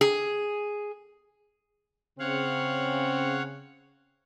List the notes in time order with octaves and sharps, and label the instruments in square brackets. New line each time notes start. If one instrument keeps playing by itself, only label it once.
[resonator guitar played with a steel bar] G#4
[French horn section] C#3 [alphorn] C4 [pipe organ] C#5 F5 F#5